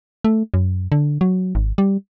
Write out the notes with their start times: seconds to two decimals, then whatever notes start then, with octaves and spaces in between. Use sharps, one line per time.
0.24 A3
0.54 F#2
0.92 D3
1.21 F#3
1.55 G#1
1.78 G3